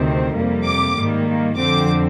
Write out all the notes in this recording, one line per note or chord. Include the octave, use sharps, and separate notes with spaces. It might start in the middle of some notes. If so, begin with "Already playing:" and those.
Already playing: D2 C3 D#3 G3 C4
F2 C3 G3 A#3
D6
G#2 D#3 G3 A#3
F2 D3 F3 C4 D6